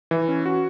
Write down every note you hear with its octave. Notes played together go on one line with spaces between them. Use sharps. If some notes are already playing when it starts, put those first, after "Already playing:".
E3
C#4
F#4